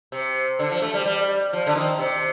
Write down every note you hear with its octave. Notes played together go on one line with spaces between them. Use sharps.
C3
D3
F3
A3
G3
G3
F3
D3
D#3
C3